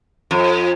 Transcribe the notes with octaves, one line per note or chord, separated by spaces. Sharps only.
F2